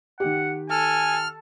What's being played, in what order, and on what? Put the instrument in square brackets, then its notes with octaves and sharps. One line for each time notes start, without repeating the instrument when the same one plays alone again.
[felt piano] D#3 G4 [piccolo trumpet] F#5
[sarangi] A4 [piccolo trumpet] G#5 [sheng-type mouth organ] F6